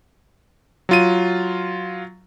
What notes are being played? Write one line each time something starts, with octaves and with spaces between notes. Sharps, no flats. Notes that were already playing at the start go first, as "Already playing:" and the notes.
F#3 F4 D#7